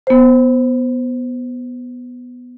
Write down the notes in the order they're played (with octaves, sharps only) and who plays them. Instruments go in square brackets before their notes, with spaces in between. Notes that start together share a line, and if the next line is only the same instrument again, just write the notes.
[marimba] B3 C5